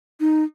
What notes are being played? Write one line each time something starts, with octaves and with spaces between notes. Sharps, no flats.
D#4